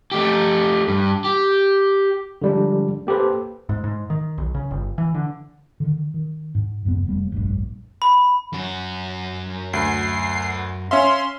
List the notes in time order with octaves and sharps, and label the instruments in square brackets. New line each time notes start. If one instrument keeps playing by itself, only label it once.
[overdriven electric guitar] A3 G4
G2
G4
[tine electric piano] D3 F3 G3 G#3 D4
A#3 G4 A4 B4 C5
[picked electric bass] G#2
G#2
D#3
B1
C#3
G1
E3
D3
[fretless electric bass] D3 D#3
D#3
G#2
D#1 F#2 C#3 B3
F1 G3 A#3
F1 A#1 G2
[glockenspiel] B5
[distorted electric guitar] F#2 F#4
[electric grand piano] D2 [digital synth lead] C7
[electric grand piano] C#4 E5 F5 [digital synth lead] C6